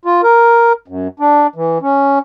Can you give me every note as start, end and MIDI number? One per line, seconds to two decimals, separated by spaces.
0.05 0.21 65
0.23 0.73 70
0.88 1.08 42
1.20 1.47 62
1.55 1.78 52
1.82 2.19 61